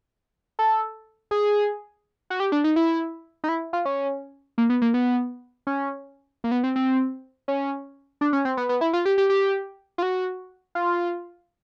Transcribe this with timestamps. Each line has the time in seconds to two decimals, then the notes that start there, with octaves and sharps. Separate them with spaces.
0.59 A4
1.31 G#4
2.30 F#4
2.40 G4
2.52 D4
2.64 D#4
2.76 E4
3.44 D#4
3.49 E4
3.73 F4
3.85 C#4
4.58 A#3
4.70 B3
4.82 A#3
4.94 B3
5.67 C#4
6.44 A#3
6.51 B3
6.64 C4
6.76 C4
7.48 C#4
8.21 D4
8.33 C#4
8.45 C4
8.57 B3
8.69 B3
8.81 E4
8.93 F4
9.05 G4
9.18 G4
9.30 G4
9.98 F4
10.02 F#4
10.75 F4